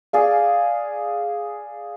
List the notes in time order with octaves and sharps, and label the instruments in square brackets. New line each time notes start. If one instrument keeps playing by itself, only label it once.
[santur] G#4 D5 F5